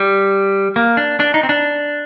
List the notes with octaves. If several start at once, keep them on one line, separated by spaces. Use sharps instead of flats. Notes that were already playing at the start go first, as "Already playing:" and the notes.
Already playing: G3
A#3
D4
D4
D#4
C4
D4